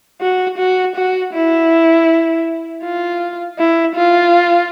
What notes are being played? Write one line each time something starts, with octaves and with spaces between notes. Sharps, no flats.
F#4
F#4
F#4
E4
F4
E4
F4